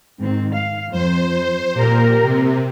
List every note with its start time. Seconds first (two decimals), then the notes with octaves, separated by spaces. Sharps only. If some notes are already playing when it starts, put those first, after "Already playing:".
0.21 G#2 D#3 C4
0.54 F5
0.91 F2 C5
1.74 A#2 G4 A#4
2.22 C3